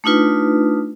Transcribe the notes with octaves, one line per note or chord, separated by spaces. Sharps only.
A3 D4 D#4 F4 B4